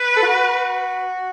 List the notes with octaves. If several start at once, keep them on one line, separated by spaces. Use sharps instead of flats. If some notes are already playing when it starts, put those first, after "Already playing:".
Already playing: B4
A4
F#4